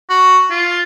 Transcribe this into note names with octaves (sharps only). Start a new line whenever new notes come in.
F#4
F4